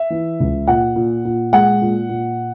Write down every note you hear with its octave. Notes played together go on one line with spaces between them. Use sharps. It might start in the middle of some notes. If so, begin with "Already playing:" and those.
Already playing: E5
E3
C#2
A#2 F#5
A#2
A#2
G#3 F#5
A#2
A#2